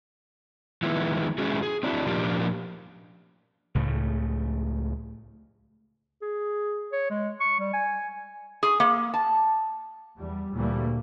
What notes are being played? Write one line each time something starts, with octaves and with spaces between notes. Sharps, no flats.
D#3 F3 G#3 B3 E4
G#3 C#4 E4 F#4 G#4
G#4
C4 D4 E4 F#4
A#2 F3 A#3 D4 F4 G4
C#2 A2 C#3 A3
G#4
C#5
G#3
C#6
G3
G#5
G#4
A#3
A5
E2 G3
D2 A#2 E3 G3 A3 A#3